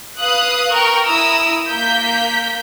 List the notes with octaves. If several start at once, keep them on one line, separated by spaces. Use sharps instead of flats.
B4 F5 D#6 F#6
A#4 G5 C#6
E4 A#5 D#6 E6
A#3 G6 B6